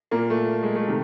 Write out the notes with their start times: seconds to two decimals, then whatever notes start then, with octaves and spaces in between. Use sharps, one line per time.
0.11 A#2 A#3
0.30 A3
0.63 G#3
0.75 A3
0.88 C3 D#3